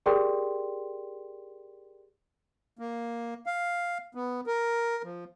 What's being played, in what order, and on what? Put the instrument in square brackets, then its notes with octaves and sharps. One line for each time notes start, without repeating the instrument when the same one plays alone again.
[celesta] G4 G#4 A#4 D5 G5 C6
[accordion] A#3
F5
B3
A#4
F3